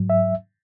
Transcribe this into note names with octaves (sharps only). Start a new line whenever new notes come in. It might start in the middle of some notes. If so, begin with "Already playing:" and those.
Already playing: G#2 F#3
E5